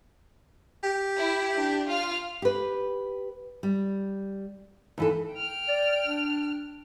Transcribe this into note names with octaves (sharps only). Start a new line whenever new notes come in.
G4
E4
D4
F4 F6
G4 B4
G3
D#2 E3 A4
G5 F6
D5
D4